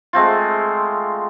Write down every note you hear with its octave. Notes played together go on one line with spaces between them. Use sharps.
G#3 A3 C4 F4